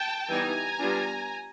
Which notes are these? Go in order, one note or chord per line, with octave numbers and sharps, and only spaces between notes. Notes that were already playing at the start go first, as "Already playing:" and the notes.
Already playing: G5 A5
E3 G3 B3 D#4 G#5 A#5
G3 B3 D4 F4